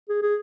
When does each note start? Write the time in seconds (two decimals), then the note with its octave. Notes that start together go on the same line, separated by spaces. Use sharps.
0.09 G#4
0.22 G#4